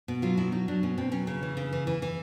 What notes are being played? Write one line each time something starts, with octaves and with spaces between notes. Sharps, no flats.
B2
F#3 F4
B2 E4
F#3 D#4
F#3 D4
B2 C#4
B2 C4
F#3 C#4
C#3
E3
C#3
E3
E3
E3